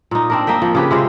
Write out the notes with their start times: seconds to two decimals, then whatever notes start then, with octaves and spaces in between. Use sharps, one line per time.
0.11 A#2 D#4
0.30 C4 D4 A#4
0.47 A#3 D#5 E5 G5
0.62 F3
0.75 C#3 G4 B4
0.91 C3 G#3 F4 C5